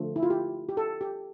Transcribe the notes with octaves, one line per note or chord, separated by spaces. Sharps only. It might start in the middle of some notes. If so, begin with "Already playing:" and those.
Already playing: D3 F3 A3
E4
F4
G4
G4
A4
G4